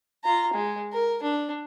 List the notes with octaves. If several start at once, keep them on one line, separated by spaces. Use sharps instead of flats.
F4 A#5
G#3
A#4
D4